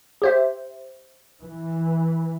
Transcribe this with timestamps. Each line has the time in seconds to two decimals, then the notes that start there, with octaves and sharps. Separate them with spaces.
0.22 G4 C5 E5
1.41 E3